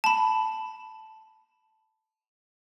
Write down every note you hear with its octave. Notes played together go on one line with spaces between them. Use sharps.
A5 B5